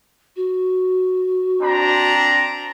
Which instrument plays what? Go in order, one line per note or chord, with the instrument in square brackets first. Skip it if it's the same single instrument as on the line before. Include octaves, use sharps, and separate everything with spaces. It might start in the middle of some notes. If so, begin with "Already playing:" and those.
[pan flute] F#4
[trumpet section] C4 D4 A#5